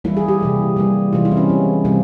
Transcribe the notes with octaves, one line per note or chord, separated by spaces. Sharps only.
E3 G3 A#3 E4
G#4
G4
C3 E3 A#3
E3 G3 A#3
C3 E3 G#3 F4
E4
C4
C#4
E3 A#3
C3 G3 A#3 C4